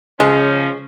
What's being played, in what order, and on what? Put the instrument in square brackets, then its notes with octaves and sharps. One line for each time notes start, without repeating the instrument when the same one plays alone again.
[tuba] C#3 [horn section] F3 C#4 [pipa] G#3